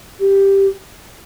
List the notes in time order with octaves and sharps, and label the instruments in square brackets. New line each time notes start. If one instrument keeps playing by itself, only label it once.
[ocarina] G4